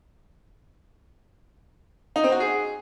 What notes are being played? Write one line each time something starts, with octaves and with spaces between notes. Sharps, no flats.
D#4
C4
F#4
G#4